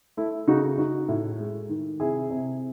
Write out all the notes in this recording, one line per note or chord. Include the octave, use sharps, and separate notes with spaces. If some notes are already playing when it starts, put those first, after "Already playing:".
A3 E4
C#3 D#4 F#4
D#4 F#4
A2
G#3
D#3
C3 E4 G#4
C3